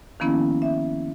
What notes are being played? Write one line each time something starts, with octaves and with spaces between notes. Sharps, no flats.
D#3 F3 A#3 B3 C#4 E4
E5